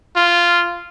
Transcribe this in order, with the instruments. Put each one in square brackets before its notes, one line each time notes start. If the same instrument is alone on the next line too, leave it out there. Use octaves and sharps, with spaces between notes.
[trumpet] F4